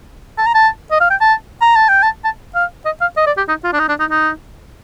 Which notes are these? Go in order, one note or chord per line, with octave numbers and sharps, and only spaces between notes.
A5
A#5
A5
D#5
F5
G5
A5
A#5
A5
G5
A5
A5
F5
D#5
F5
D#5
D5
G4
D#4
F4
D4
D#4
D4
D#4
D#4